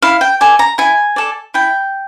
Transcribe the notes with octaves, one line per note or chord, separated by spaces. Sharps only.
E4 F5
G5
A4 D5 G#5
A#5
E4 G#5
A4 D5
E4 G5